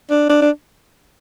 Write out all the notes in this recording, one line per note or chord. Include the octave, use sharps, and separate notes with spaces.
D4
D4
D4